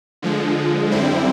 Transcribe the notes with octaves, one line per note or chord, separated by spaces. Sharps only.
D3 F3 G#3
F#2 D3 G3 C4 E4